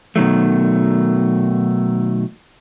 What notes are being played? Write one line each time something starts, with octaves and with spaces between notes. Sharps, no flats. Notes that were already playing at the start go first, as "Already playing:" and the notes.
B2 D#3 F#3 A3